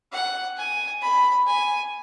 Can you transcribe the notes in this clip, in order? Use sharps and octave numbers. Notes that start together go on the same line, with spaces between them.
F#5
G#5
B5
G#5